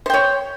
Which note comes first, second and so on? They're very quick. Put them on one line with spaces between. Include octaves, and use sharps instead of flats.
C5 G5 C#5